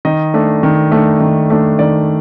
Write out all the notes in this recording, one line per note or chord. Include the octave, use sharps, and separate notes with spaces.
D#3 D#5
A3 D4
D#3
A3 D4
D#3
A3 D4
D#3 D5